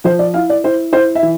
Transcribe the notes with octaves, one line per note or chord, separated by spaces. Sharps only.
F3 C5
D5
E4 F5
D5
E4 C5
E4 C5
E5
E3